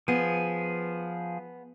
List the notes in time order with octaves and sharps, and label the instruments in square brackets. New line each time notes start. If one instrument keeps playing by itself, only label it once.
[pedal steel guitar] F3 G#4 [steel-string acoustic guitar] B3